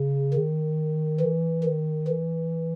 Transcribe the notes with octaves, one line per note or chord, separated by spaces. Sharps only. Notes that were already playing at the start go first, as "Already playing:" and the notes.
Already playing: C#3
D#3
E3
D#3
E3